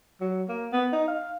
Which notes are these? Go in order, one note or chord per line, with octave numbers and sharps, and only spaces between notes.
F#3
A#3
B3
D#4
F5